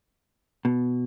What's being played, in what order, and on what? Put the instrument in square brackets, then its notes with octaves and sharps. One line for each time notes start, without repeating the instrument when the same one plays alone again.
[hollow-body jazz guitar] B2